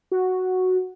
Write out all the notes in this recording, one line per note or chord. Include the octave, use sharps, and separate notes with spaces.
F#4